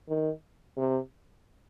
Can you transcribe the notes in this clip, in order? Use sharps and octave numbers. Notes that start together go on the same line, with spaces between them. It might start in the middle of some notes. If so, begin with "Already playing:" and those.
D#3
C3